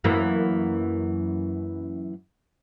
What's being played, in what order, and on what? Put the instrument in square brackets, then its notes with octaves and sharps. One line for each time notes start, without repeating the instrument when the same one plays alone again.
[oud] F#2 E3 A#3